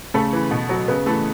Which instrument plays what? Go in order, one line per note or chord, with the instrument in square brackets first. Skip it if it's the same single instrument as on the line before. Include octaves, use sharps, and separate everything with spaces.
[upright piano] C#3 A3 A4
E3
B2
F#3
C#3 B3 B4
E3 A3 A4